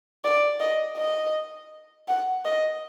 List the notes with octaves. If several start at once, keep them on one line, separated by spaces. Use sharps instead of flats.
D5
D#5
D#5
F#5
D#5